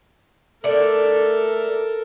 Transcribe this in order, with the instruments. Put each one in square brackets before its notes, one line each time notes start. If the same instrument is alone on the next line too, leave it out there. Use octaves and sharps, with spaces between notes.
[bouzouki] A3 D5 [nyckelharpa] A4 A#4